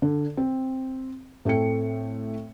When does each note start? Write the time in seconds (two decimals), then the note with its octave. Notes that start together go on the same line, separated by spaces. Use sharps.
0.02 D3
0.37 C4
1.45 A2 A3 C4 G5 C#7